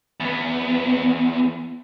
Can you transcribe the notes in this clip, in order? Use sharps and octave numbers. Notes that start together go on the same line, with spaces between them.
E2 B3